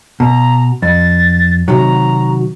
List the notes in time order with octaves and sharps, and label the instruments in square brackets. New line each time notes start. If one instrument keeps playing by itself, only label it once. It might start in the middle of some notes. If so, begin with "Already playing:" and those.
[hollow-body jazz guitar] B2 [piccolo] A#5
[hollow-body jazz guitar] F2 [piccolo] A6
[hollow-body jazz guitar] C3 D#3 F#3 [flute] F#4 [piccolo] A#5